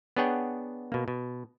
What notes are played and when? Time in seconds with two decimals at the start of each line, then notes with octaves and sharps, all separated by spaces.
0.17 B3 D4 G#4 C#5 F#5 G5
0.92 B2 A#3
1.08 B2